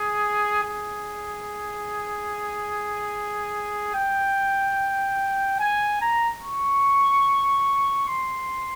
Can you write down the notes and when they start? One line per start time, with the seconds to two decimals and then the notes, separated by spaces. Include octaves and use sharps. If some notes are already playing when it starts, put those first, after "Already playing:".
Already playing: G#4
0.64 G#4
3.95 G5
5.60 G#5
6.01 A#5
6.42 C#6
8.08 C6